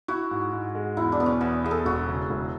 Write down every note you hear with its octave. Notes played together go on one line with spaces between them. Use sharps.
E4 F#4
G#2
G#2
G#3
E2 E4
D4
B2 B3
C#4
E2 B3
E2 G#4
A4
E1 F#4
C#3
E1